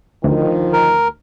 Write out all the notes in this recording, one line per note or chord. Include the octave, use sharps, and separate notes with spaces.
D2 D#3 F3
A#4